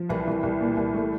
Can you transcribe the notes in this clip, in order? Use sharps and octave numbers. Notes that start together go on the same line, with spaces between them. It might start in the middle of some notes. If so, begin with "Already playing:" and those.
Already playing: F3
C2 E3
C2
C2
A#2
C2
A3